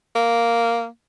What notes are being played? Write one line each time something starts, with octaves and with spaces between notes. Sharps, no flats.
A#3